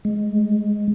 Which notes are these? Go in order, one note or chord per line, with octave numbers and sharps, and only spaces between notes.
G#3